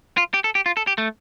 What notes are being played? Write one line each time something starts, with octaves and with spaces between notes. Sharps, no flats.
F4
G4
A4
G4
F4
A4
G4
A3